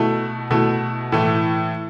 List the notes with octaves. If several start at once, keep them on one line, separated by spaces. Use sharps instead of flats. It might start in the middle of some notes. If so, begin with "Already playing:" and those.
Already playing: B2 A3 E4
B2 A3 E4
A2 E3 A3